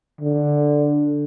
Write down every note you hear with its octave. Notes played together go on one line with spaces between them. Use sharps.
D3